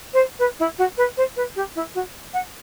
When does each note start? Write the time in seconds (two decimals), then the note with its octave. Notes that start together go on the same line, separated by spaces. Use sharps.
0.14 C5
0.39 B4
0.59 E4
0.78 F#4
0.97 B4
1.17 C5
1.36 B4
1.56 G4
1.75 E4
1.95 F#4
2.33 F#5